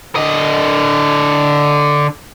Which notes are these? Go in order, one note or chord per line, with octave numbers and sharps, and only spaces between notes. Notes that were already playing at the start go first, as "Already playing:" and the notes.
D3 D#5